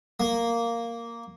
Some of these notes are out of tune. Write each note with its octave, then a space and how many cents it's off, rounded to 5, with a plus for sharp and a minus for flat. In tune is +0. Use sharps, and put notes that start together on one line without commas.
A#3 -5